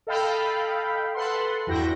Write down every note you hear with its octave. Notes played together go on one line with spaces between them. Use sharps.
A4 D#5 F5 G5 B5
A4 B4 F#5 C6
E2 G2 E4 F#4 G5 A#6